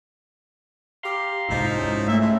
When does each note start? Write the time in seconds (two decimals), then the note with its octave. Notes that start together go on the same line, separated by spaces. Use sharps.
1.03 G4 F5 A#5 C6
1.49 G1 C2 G#2 F3 D#4 E4
1.78 G#2 C#4
2.07 A#2 A3 E5
2.21 A2 G#3